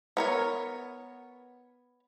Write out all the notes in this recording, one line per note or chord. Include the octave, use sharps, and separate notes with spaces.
B3 A#4 C#5